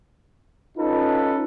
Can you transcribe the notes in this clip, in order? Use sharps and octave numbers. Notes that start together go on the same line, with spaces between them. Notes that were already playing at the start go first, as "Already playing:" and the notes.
C#4 D#4 F4 A4 B4